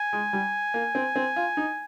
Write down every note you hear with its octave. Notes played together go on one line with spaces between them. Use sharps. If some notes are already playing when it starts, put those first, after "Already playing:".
Already playing: G#5
G#3
G3
A#3
C4
C4
F4
D#4